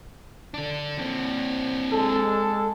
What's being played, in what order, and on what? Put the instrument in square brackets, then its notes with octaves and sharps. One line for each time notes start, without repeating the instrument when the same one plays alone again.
[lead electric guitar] D3 D4
C4 D4
[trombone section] G#3 A4